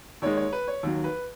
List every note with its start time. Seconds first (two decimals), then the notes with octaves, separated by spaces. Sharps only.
0.22 D#2 D#3 G#3 C#5
0.37 C#5
0.52 B4
0.68 C#5
0.83 D#2 D#3 F#3
1.04 B4